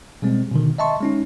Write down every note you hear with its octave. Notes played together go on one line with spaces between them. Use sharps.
B2 G3 G#3 C4
B2 D3 D#3
D#5 E5 A5 C6 C#6
G#3 C#4 D#4